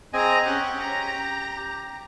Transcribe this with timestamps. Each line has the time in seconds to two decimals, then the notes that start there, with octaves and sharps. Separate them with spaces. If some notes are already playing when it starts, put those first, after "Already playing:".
0.13 C4 G#4 D#5 G#5 A#5
0.45 C#4 G4 F#5
0.79 A#5